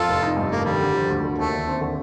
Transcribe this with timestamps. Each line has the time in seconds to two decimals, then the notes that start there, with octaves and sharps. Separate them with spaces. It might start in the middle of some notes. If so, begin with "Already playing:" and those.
Already playing: F2 F4 A4
0.09 F1
0.23 D#4
0.37 G2
0.51 A3 A#3
0.65 D#3 G3
0.80 D3
0.94 F3
1.09 D2
1.24 D3
1.38 D#2 A3
1.52 D3
1.67 C4
1.81 D3